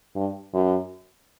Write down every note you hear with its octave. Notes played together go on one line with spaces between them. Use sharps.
G2
F#2